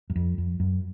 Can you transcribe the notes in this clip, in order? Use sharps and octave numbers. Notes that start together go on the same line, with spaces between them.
F#2
F2
F2
F#2